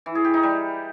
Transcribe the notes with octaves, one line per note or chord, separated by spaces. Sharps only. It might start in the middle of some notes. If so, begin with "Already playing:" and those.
E3
G#4
G4
D#4
G3